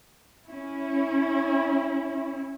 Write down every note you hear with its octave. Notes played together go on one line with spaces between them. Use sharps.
C#4 E4